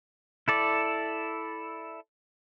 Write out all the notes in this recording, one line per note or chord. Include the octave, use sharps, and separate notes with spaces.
E4 A4 D5